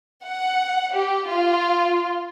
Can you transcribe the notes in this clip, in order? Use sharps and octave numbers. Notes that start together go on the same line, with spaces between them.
F#5
G4
F4